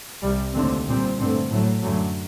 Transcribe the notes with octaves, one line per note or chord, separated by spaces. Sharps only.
C2 C3 G3
D#2 D3 A3 C4
A#2 G3 C4
G2 D3 A3 C4
A2 F#3 A3
F#2 D3 F#3 A3